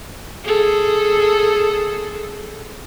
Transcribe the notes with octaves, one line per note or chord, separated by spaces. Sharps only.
G#4 A4